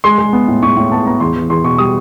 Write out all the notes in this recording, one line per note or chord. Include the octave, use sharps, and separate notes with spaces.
G#3 C6
G#3
B3
A2
A2 C#6
A2
B3 A5
B3 A#5
E2 C6
E2
E2 C6
B2 C#6
G3 D#6